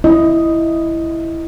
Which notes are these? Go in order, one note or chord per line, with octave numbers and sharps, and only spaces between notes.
E4 D#5